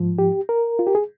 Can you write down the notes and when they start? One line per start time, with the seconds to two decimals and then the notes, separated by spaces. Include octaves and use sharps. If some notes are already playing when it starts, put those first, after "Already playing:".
Already playing: G#2 F3
0.18 G4
0.49 A#4
0.79 F4
0.87 G4
0.95 G#4